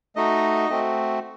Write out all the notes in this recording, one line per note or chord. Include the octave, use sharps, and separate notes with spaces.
A3 D#4 F#4 D#5
A3 C4 F#4